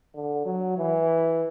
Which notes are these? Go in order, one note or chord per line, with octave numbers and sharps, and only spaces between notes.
D3
F#3
E3